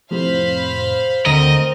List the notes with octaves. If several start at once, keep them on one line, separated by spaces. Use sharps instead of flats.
F2 A2 C3 C5 F5 B5
D2 C4 A#4 D#5 A#5